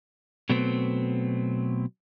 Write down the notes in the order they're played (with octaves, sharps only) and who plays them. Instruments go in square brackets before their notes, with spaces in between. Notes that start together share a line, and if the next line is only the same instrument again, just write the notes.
[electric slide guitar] B2 F#3 A3 B3 C4